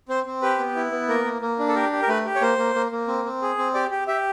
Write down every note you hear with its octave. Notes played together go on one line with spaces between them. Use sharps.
C4 C5
C4
G4 B4
B3
E4
B3
A#3 A#4
A#3
A#3
D4
A4
G4 A#4
G4
A#4
A3 B4
G4
C#5
A#3 C5
A#3
A#3
A#3
C4
C4
G#4
C4
G4 D5
G4
G4 E5